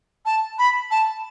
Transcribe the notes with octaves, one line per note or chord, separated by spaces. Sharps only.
A5
B5
A5